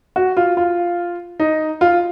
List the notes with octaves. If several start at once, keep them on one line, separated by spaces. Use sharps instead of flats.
F#4
F4
F4
D#4
F4